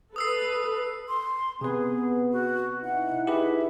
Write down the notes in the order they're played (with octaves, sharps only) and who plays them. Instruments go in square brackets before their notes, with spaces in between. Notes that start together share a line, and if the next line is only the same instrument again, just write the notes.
[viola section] A4 B4 [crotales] D#6 E6 C7
[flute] C6
[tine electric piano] C3 B4 [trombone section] B3 [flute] G#4
[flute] F#4
[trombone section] D#4 E4 [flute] F#5
[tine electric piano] G4 G#4 B4 [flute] E5